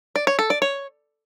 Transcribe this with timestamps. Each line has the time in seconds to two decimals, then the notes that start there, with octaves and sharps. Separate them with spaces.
0.16 D5
0.27 C#5
0.39 A4
0.50 D5
0.62 C#5